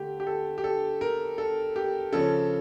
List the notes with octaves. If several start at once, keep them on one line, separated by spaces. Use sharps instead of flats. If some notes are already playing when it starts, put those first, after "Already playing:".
Already playing: D3 A3 G4
G4
A4
G4
A4
A#4
A4
G4
C#3 F3 C#4 A4